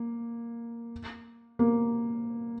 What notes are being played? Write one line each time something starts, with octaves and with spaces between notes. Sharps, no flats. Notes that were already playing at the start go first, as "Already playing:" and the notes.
Already playing: A#3
A#3